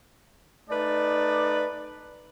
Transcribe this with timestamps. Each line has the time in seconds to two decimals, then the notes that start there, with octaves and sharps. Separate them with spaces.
0.70 A3 D#4 B4 D5